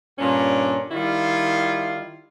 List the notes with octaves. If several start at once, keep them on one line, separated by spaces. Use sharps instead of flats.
G2 A#2 C#4 D4
D#3 G3 E4 F4